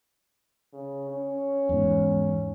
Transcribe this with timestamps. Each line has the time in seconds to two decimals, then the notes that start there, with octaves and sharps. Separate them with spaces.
0.73 C#3
1.10 C#4
1.69 E2 G#2